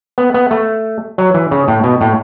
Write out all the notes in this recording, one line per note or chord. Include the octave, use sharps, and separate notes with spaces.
B3
B3
A3
F#3
E3
C#3
A2
B2
A2